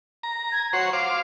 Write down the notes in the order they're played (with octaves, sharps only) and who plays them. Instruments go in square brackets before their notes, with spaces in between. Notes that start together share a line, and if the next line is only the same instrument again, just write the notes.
[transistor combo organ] A#5
[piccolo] G#6
[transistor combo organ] F#4 C5 C#5 [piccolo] C7
[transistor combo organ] C5 F5 D6